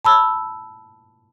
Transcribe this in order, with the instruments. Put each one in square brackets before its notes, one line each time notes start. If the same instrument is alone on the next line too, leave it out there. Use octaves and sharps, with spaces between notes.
[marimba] A5 B5 E6